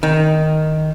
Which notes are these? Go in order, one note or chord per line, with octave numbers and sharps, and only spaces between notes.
D#3